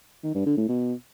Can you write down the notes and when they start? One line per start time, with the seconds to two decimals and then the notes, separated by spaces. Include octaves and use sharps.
0.23 D#3
0.35 G2
0.46 D3
0.57 A2
0.68 B2